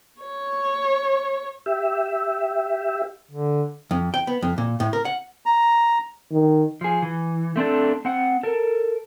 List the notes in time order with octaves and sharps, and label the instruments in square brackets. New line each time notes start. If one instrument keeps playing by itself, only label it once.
[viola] C#5
[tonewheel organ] G4 E5
[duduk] D3
[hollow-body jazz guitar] F2
G5
B3
F2
A#2
A2
A#4
F#5
[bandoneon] A#5
[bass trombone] D#3
[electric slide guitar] F3 G#4
E3
A3 C4 D4 A4
C4 F#5
A4 A#4